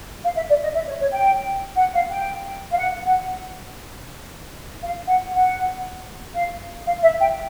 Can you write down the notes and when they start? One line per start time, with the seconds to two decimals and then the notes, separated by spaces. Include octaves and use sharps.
0.24 F5
0.36 E5
0.49 D5
0.62 D#5
0.74 E5
0.87 C#5
1.00 C#5
1.12 G5
1.77 F#5
1.94 F5
2.11 G5
2.72 F5
2.78 F#5
3.04 F#5
4.82 F5
5.07 F#5
5.33 F#5
6.35 F5
6.86 F5
7.03 E5
7.20 G5